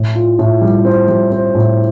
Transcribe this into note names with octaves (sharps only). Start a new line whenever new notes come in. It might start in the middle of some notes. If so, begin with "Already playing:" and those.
Already playing: A2
F4
A2
G3
C4
G3
C4
A2